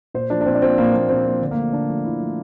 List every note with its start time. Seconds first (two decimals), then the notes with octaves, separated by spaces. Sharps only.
0.14 A#2 C5
0.30 F3 A#3 D4
0.41 D4
0.46 A#2 C4
0.55 D4
0.62 F3 A#3 C4
0.78 A#2 A#3
0.93 F3 A#3
1.09 A#2 C4
1.25 F3 A#3
1.41 D3
1.51 A#3
1.57 F3 A3
1.73 D3 D4
1.89 F3 A3
2.04 D3 E4
2.20 F3 A3